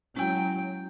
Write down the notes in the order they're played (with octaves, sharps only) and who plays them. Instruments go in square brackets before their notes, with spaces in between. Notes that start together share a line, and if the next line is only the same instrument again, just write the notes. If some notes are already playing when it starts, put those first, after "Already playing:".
[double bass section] F#3 [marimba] G#3 E4 [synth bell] C#4 G#5 [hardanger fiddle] G5